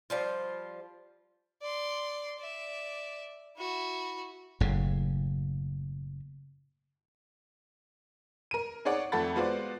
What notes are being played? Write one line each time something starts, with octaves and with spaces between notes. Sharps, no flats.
F3 G3 F4
D5 C6
D5 E5
E4 F#4
F#1 A2 C#3
A#4 D#7
D#4 G#4 C#5 D5 F#5
F2 A3 A4 F#5 B5 A6
G#3 B3 F4 F#4 C5 D5